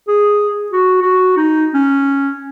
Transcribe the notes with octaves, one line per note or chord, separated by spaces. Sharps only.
G#4
F#4
F#4
D#4
C#4